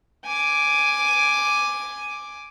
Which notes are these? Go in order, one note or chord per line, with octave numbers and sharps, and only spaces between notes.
G#5 D6